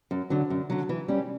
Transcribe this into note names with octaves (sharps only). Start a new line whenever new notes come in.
F#2
D3 F#3
F#2
D3 F#3
E3
G3 C#4 G4